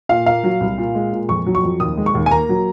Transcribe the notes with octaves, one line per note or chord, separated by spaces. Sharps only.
A#2 F5
A#3 F5
F#3
C2
A#2
G#3
A#2
F2 C#6
F#3
C#6
F2
D#2 D#6
G#3
C#6
D#2
G#5
A#3 A#5
F#3